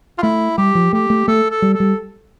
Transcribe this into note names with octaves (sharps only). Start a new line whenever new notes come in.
F4
A3 E4
G3 G4
F3
A3 G4
A3
A3 A4
A4
G3
A4
G3